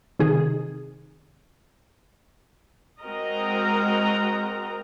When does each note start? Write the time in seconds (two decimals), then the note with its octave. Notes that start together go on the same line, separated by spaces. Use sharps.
0.19 C3 D#3 G#4
3.02 G#3 C4 F#4 A#4 D#5 A#5